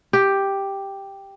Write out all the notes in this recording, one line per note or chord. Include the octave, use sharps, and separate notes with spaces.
G4